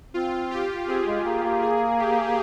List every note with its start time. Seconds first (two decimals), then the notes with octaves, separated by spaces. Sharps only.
0.14 C4 F4
0.51 G4
0.88 C4 G#4
1.07 G#3
1.25 A#3
1.43 A#3
1.62 G#4
1.99 G4